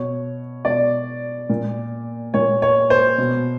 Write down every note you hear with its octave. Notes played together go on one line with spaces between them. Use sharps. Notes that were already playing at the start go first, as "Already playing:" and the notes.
Already playing: B2 C#5
B2 D5
A#2
A#2 C#5
C#5
C5
B2